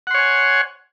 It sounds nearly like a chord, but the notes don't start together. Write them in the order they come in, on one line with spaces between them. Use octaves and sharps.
F#5 C6 C#5 G#5